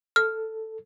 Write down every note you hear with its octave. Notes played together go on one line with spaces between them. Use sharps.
A4 F6